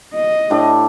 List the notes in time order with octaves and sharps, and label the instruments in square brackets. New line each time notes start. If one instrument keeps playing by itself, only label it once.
[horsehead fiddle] D#5
[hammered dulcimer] A2 D4 G4